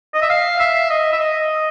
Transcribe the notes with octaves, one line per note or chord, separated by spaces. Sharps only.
D#5
E5
F5
E5
D#5
E5
D#5